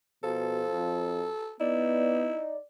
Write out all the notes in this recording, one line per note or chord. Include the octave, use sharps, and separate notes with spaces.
B2 F3 A4
F2
B3 D#4 E4 D5